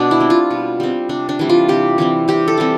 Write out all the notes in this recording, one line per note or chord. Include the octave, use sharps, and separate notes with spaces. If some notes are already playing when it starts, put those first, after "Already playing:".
Already playing: B2 D4
E4
G3 C4
F4
B2
G3 C4
C3 D4
D4
E3 G3 C4
F4
C3 G4
E3 G3 C4
C3 G4
A4
E3 G3 C4